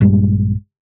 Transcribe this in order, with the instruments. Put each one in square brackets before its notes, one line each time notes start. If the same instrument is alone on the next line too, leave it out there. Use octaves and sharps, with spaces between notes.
[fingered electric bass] A#1 G2 G3 G#3